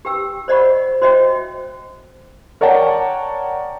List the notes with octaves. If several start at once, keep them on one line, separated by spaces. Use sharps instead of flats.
G4 B4 G5 E6
C5 D5 D#5 F#5 B5 C#6
F#4 C5 C#5 D#5 E5 G5
A#4 C#5 D5 F#5 G5 A5